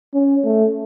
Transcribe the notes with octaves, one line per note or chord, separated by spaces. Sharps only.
C#4
A3